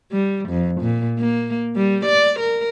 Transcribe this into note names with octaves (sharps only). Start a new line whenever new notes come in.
G3
F2
A#2
A#3
G3
D5
A#4